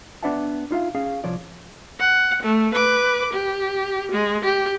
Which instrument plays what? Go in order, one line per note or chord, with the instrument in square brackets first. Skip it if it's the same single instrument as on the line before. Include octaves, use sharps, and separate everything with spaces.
[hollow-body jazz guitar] B3 D4 B4 E5 F#5 A5
D#4 F4 E5 F5
C#4 G#4 F5
C2 F3 C#5 D5
[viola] F#5
A3
B4 D6
G4
G#3
G4